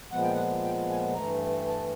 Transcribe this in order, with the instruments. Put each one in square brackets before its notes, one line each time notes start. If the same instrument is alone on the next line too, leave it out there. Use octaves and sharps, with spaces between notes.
[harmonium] A#2 F3 G#3 B3 F#5
G5
F#5
G5
G#5
G2 E3 A3 A#5
A5